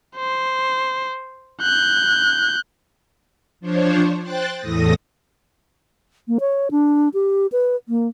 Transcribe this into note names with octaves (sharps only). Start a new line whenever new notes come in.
C5
F#6 G6
F3 D4 C5 C#5
C5 G5 F#6 A6
E2 A2 A3 D#6 A#6
A#3
C#5
D4
G4
B4
A#3